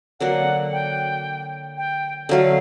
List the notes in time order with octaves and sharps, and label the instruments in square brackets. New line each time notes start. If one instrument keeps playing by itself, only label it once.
[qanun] D3 F#3 A#3 D4 [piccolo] F#5
[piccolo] G5
G5
[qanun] D3 F#3 A3 [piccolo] F5